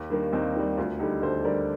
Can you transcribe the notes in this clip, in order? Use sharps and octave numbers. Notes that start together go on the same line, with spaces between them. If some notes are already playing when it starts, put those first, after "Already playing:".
Already playing: D#2
D#3 G3 A#3 D4
D#2 C4 D#4
D#3 G3
D2 D4 F4
D3 G3 D#4 G4
D2 A4 C5
D3 G3 A#4 D5